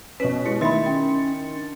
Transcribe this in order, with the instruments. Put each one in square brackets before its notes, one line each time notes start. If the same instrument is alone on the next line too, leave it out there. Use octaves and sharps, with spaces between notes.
[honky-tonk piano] B2 C#4 [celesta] B4 C#5 [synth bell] B6
[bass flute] G#3 [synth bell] E4 [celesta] C#7
[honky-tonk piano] D#3 [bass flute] A3 [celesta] E5 B5 [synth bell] C6 A6 C#7
[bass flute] C#4 [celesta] G5
[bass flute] D4